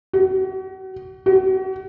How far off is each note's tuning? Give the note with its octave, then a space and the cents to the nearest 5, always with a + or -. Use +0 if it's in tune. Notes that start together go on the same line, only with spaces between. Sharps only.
F#4 +35
F#4 +35